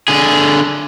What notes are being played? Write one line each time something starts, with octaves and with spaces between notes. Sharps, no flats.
D3 G#4